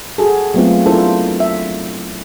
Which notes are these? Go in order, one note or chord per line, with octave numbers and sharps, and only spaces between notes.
F#4 G#4 A4
F#3 G#3 A3 B3 C4 F4
D4 E4 F4 A4 A#4 C5
E5